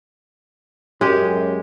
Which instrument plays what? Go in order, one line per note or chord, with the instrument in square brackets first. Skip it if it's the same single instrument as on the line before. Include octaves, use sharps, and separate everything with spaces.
[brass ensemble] F#2 [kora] G#3 G4